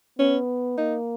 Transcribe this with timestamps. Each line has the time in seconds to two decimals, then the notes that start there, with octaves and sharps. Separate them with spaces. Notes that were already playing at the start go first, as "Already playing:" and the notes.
0.19 B3 C#4
0.78 A#3 D#4